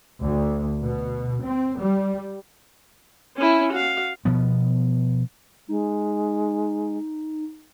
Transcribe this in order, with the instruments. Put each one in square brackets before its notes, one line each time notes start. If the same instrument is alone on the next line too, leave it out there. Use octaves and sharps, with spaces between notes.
[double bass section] D2
B2
C4
G3
[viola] C#4 E4
F#4 F5
[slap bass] B2 F3 B3
[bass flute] G#3 [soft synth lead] D#4